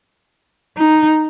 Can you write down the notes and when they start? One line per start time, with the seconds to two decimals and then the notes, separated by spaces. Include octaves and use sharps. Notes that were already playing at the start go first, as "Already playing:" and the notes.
0.77 D#4